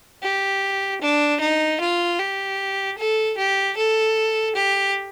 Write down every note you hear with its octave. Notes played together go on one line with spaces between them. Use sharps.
G4
D4
D#4
F4
G4
A4
G4
A4
G4